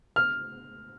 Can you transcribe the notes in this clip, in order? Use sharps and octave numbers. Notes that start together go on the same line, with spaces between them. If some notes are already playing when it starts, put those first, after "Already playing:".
F6